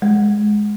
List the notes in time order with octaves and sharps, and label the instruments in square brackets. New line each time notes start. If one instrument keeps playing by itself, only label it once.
[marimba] G#3